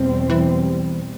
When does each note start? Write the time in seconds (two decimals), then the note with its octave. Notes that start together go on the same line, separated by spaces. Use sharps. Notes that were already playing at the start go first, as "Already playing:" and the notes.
Already playing: E2 B2 G3 C4
0.30 E3